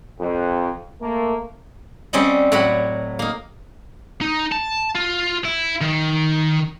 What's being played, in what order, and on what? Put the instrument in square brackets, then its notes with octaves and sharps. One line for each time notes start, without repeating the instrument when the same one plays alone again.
[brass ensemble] F2
A3 A#3
[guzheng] G3 C4 C#4 D5 D#5 F#5
A2 F#3 F#4 D5 F#5 B5
A#3 D#4
[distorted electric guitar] D#4
A5
F4
E4
D#3